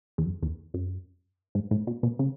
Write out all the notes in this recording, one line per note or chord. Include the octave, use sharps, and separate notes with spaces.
E2
F#2
E2
F#2
G#2
A2
B2
B2
C#3